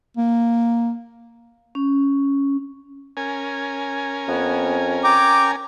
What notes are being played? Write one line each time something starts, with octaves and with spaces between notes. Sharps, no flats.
A#3
C#4
C#4 A#4 G#5
F2 B3
G5 A#5 D6